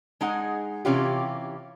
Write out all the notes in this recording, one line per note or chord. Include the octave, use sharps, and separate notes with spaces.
G#3 D#4 G#4 F#5
C3 E3 C#4 F4 G4